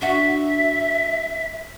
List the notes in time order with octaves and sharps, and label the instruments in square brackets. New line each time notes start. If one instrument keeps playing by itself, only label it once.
[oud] D4 F#4 [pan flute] E5